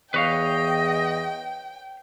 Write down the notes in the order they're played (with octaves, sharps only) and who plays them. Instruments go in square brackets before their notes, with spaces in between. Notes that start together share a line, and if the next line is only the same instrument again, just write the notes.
[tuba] E2 [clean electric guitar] B4 C#5 F5 [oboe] D#5 [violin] G5